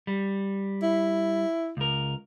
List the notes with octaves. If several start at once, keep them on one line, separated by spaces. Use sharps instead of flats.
G3
E4
C#2 A#4